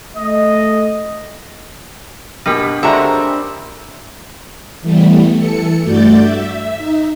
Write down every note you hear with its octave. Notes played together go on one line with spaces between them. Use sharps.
A3 D#5
F#2 B2 A#3 D4 G4 A#4
D3 G3 G#3 C4 F#4 E5 A#5
E3 G3 A3 B3
E3 A4 C#7
G2 A3 F#4 D5 G6 A6
E5
D#4